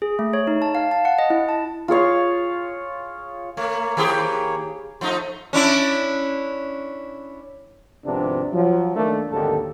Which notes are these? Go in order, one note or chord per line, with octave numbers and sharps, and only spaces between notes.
G#4
A3
C#5
D#4
A5
F5
A5
F#5
D#5
E4
A5
F4 G#4 C#5 F5
A3 A#3 C#5
D#3 G4 G#4
F3 A3 D#4 C6
C#4 D4 E4
G#1 C3 F3 B3 D4
F3 F#3
D#3 A3 A#3 D4
G#1 D#2 D3 F#3 G4 A4